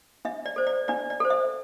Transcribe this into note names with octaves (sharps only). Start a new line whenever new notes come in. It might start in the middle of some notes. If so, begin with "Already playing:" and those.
D4 E5
D5
A4 C5
D5
D4 D5
D5
A4 C5
E5